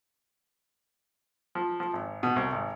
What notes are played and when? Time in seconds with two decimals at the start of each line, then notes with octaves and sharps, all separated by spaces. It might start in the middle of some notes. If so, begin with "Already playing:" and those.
1.55 F3
1.80 F3
1.93 G#1
2.23 B2
2.36 C2
2.52 G#1